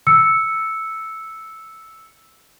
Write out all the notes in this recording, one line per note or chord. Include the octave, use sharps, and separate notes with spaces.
E6 C#7